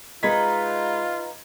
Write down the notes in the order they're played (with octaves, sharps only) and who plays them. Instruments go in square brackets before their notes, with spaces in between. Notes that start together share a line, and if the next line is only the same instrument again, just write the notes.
[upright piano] G#3 G#6 B6 [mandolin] D#4 B4 [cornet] F4